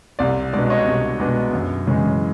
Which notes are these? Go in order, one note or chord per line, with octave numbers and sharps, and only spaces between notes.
C2 D5
B2 G#3 B3 D4 D5
C#5 D#5
C2
B2 G#3 B3 D4
F#2
C#3 E3 G#3 C#4